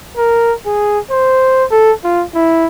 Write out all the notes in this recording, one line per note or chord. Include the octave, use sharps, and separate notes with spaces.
A#4
G#4
C5
A4
F4
E4